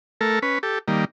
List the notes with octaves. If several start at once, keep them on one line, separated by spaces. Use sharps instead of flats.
A3 A4 A#4
C#4 B4
G4 A4
D#3 G3 A#3